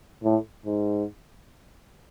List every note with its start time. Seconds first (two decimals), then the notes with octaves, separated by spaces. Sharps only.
0.24 A2
0.66 G#2